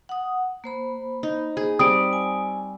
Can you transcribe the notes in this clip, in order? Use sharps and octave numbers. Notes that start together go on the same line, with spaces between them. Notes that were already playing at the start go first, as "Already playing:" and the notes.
F#5 D#6
A#3 C5 B5
D#4
G#4
G3 C4 D#6 D7
G#5